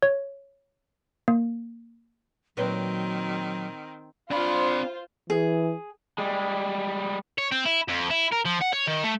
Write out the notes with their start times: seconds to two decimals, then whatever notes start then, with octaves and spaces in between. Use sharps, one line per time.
0.03 C#5
1.28 A#3
2.57 A#2 D#3 F#3 C4 B4 C#5
4.31 C4 D4 F4 C5 B5
5.30 E3 G#4
6.18 G3 G#3
7.38 C#5
7.52 C4
7.66 E4
7.88 F2
8.11 E4
8.32 A#4
8.46 F3
8.62 F#5
8.73 C#5
8.87 D#3
9.03 A3